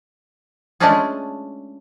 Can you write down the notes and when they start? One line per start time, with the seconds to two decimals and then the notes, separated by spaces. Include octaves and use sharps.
0.80 G#3 A3 C#4 D4 F4 G#4